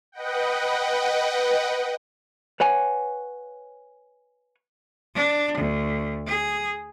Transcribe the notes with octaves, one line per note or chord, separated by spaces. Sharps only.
B4 D#5 F#5 G5
B4 C#5 F#5 G#5
D4
D2
G#4